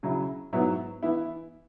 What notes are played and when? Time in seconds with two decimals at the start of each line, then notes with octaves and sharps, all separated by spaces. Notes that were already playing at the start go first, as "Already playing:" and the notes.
0.03 C#3 F#3 E4
0.52 G#2 F#3 B3 E4
1.03 E3 B3 E4